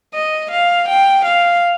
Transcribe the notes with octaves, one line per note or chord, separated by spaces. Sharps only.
D#5
F5
G5
F5